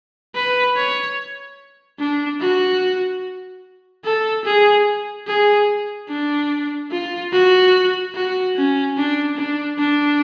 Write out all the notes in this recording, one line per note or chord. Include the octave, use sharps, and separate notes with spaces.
B4
C#5
D4
F#4
A4
G#4
G#4
D4
F4
F#4
F#4
C#4
D4
D4
D4